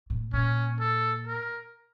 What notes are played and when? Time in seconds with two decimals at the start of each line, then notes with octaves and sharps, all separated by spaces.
0.10 A2
0.33 A#2 C#4
0.80 A4
1.27 A#4